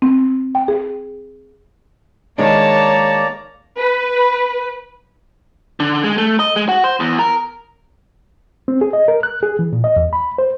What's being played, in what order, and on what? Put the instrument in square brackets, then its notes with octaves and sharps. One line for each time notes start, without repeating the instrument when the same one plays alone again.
[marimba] C4
G5
G#4
[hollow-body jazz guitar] D#3 G#3 D4 [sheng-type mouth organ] A#3 D5 A#5 [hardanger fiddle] C#5 A5
[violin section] B4
[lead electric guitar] D3
G#3
A3
D#5
G#3
F#4
C5
E2
A#4
[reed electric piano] C4
G#4
D#5
A#4
F#6
G#4
E3
A#2
D#5
E2
B5
C5